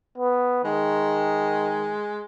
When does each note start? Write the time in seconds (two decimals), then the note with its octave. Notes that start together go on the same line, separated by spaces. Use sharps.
0.18 B3
0.65 D#3 G#3